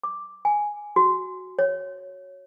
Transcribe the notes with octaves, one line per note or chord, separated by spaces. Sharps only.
D6
G#5
F#4
C#5